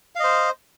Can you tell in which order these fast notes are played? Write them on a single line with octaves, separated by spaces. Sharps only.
F5 D#5 C5